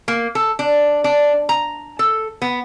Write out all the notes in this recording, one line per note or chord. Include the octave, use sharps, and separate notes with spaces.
A#3
A4
D4
D4
A#5
A4
B3